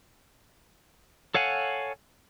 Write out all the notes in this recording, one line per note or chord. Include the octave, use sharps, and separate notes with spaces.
A4 C#5 F5 F#5 G#5